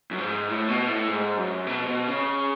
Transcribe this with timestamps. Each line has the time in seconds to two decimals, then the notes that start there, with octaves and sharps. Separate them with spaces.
0.11 F#2
0.18 G#2
0.47 A2
0.68 B2
0.88 A2
1.08 G#2
1.37 F#2
1.67 B2
1.86 B2
2.07 C#3